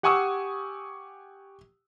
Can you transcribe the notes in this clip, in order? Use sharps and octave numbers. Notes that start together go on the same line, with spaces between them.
G4 F#5 G#5 C#6 D#6 E6